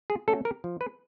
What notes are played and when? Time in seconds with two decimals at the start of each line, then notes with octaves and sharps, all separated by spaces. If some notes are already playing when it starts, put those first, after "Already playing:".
0.10 G#4
0.28 A3 C#4 A4
0.45 A#4
0.64 F3
0.81 B4